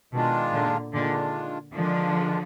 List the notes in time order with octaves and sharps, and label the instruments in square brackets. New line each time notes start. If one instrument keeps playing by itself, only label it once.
[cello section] B2 [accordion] D#3 G#3 D4 F4
[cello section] A#2 D3
[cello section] A#2 D3 [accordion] D#3 G#3 D4 F4
[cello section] D3 F3 [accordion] D#3 G#3 D4 F4